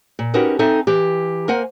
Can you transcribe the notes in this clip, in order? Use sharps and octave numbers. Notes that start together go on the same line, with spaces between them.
A#2
C#4 D#4 F#4 G4 A#4 B4
C4 D#4 A4 E5 G#5
E3 G4
A#3 A#4 C5 F#5 G#5